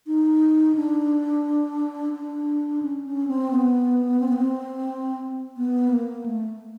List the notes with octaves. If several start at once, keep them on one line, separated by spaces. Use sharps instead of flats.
D#4
D4
D4
C#4
C#4
C4
B3
C4
B3
C4
B3
A#3
A3